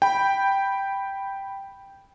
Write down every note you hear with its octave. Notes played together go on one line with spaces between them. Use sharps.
G5 B5